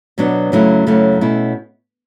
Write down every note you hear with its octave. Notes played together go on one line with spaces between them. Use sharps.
B2 F#3 B3 D4
F#2 C#3 F#3 A3 E4
F#2 C#3 F#3 A3 E4
B2 A3 C#4 E4